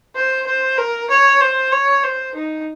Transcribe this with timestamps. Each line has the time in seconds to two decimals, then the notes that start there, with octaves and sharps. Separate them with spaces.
0.15 C5
0.46 C5
0.78 A#4
1.10 C#5
1.41 C5
1.72 C#5
2.04 C5
2.35 D#4